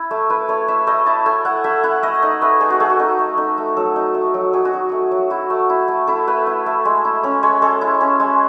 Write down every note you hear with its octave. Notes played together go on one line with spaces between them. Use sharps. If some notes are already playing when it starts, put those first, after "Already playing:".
Already playing: E4
A3
E4 B4
A3 C#5
E4 E5
A3 D#5
E4 A5
A3 G#5
E4 F#5
A3 E5
E4 F#5
A3 D#5
D#4 C#5
A3 B4
D#4 G#4
F#4
A3 G#4
F#4
D#4
A3
D#4
A3
F#3 A4
D#4
A3
F#3
F#3 G#4
F#4
D#4
A3 F#4
F#3
E4 F#4
A3
E4
A3
E4 A4
A3 B4
E4
A3
G#3
E4
C#4 C#5
G#3 C#5
G#3 A4
E4
C#4
G#3